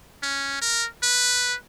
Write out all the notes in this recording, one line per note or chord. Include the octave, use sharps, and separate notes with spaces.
C#4
A#4
B4